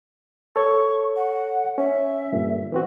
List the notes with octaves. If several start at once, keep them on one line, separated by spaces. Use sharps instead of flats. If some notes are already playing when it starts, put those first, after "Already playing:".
A4 C#5 C#6
F#5
C#4 E5
G2 A#2 D3
E3 C4 F#4